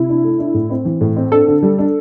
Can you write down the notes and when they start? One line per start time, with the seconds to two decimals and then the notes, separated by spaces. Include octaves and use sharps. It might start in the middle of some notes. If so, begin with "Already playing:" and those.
Already playing: C3 E4
0.09 D4
0.24 A3
0.39 D4
0.54 A2
0.70 C4
0.85 E3
1.01 A2
1.16 C4
1.32 D4 A4
1.48 D3
1.63 G3
1.78 D4